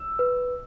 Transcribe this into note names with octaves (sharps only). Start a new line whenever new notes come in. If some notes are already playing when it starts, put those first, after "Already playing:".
Already playing: E6
B4